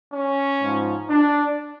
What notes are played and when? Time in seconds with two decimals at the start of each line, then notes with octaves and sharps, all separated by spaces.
0.11 C#4
0.61 G#2 F3
1.09 D4